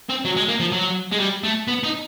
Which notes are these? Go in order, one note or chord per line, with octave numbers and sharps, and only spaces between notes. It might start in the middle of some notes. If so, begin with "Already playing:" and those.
C4
F#3
G#3
A#3
F3
F#3
G#3
G3
A3
B3
D#4